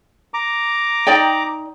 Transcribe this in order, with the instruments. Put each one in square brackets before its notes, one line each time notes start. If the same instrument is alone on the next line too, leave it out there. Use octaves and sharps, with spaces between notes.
[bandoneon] A#5 D6
[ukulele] D#4 D5 G5